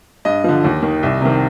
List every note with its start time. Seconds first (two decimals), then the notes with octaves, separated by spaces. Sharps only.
0.25 G2 D#5
0.44 D3 F3
0.64 D#2
0.82 D#3
1.03 C2
1.21 C3 D#3